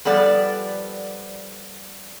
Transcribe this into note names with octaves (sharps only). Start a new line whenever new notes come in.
F3 G3 B3 A4 D5